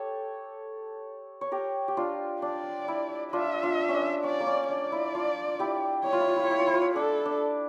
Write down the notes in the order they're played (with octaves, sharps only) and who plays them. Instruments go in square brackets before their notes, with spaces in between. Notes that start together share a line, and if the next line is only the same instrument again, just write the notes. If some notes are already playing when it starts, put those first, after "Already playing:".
Already playing: [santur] G4 A4 C#5
C#5
G4 A#4
G4
D4 F4
[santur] D4 [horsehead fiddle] D5
[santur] E4
[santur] D4 F4 [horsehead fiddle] E5
[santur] D4 F4
C#4
D4
[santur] C#4 [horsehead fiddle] D5
[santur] A#3
C#4
[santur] D4 [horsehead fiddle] D5
[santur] E4
D4 F4
E4 G4
[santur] E4 [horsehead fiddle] C#5
[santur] F4
E4
F4
E4
F4
E4
F4
E4
F4
E4
[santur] D4 [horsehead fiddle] A4
[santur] D4